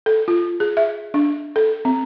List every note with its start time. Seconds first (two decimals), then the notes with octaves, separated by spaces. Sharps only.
0.06 A4
0.28 F4
0.60 G#4
0.77 E5
1.14 D4
1.56 A4
1.85 C4